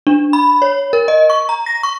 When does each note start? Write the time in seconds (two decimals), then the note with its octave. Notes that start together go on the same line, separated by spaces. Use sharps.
0.07 D4
0.33 B5
0.62 C#5
0.93 A#4
1.08 D#5
1.30 C#6
1.49 A#5
1.66 A#6
1.83 C#6